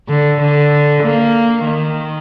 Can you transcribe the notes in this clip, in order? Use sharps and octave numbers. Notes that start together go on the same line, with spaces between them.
D3
D3
A#3
D#3